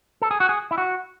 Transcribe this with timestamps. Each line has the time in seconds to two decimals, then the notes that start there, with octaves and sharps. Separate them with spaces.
0.22 A4
0.31 G#4
0.40 F#4
0.49 G#4
0.71 E4
0.78 F#4